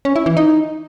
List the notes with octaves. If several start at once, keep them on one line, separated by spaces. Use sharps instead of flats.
C#4
E4
E3
D#4